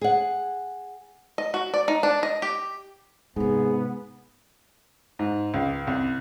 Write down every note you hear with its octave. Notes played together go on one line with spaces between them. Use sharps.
G#4 F#5
D#5
F#4
D5
D#4
D4
D#5
G4
G#2 C3 G#3 B3 G#4
G#2
C#2
C2